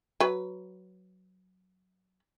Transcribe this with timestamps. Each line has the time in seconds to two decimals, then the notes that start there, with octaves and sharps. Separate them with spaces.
0.20 F#3 B4